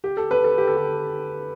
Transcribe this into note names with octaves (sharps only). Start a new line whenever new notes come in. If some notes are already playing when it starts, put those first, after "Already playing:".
G4
A4
B4
A4
G4
A4
G4